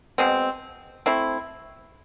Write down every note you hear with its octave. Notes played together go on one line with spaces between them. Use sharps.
B2 G#3 C4
A3 C4 E4